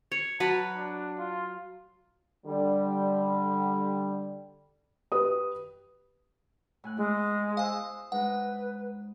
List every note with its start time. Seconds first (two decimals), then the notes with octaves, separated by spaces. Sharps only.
0.12 C#5
0.40 F#3 B4 A5 B5
0.77 D4
1.18 F4
2.46 D3 G3
5.12 G4 B4 D#6
6.84 A2 G#5 F#6
6.97 G#3 B3 E4
7.57 C5 F5 G#5 D#6 E6
8.12 G#3 C#4 D#4 B4 F#5